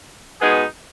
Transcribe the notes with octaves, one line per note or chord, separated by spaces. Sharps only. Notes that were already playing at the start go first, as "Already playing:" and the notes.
B2 G#3 B3 D#4 G#4